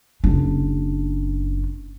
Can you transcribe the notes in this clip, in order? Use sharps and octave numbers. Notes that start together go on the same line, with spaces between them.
F#1 D4